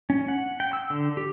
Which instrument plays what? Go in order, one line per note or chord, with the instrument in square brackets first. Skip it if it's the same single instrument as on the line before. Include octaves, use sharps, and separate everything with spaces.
[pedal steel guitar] C#4
F#5
G5
E6
D3
G4